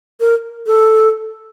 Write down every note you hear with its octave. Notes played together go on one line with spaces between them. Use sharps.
A#4
A4